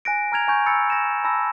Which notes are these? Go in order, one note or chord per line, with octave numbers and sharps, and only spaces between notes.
G#5 F#6 A#6 D7
A#5 F6 G#6 F7
G#5 C#6 G6
B5 E6 F6 G6 A6 C#7
A#6 E7
A5 B5 E6 A#6